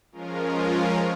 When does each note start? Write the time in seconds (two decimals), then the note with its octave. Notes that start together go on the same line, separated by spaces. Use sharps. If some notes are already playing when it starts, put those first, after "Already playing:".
0.12 F3 G#3 C#4 F4 A#4